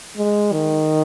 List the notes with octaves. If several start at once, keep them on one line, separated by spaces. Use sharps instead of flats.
G#3
D#3